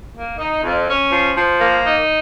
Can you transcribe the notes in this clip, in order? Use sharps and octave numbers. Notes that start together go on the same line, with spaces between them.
A#3
D#4
F2
C#4
F3
F3
A#3
D#4